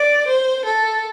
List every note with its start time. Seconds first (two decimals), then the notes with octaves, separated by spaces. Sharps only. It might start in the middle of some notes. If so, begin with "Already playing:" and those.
Already playing: D5
0.27 C5
0.65 A4